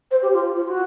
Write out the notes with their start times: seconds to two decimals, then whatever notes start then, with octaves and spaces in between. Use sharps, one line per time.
0.11 C5
0.22 G4
0.33 F4
0.56 F4
0.66 F#4